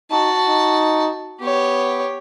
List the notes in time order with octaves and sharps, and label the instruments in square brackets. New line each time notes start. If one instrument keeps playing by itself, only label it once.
[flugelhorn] D#4 [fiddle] F#4 A5
[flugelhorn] D#4
[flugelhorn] B3 [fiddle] G4 C#5